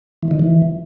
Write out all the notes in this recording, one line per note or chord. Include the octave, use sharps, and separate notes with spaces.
E3
D#3
E3